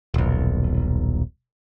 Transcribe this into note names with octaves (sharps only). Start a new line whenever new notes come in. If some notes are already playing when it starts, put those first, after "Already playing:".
D#1 B1